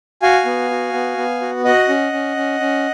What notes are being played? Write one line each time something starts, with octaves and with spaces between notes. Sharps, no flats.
F#4 F5 G#5
B3
F#4
B3
B3
F#4
F#4 D#5 F#5
C#4
C#4
C#4
C#4